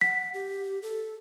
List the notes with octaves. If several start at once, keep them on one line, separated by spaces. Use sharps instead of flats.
F#5 B6
G4
A4